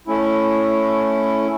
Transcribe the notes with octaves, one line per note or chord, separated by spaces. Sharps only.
A3 C#4 E4